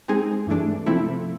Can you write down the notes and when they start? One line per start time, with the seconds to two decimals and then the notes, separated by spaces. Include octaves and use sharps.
0.08 G#3 C4 D#4 G#4
0.47 G2 E3 A3 D4
0.86 C3 F3 A3 C4 E4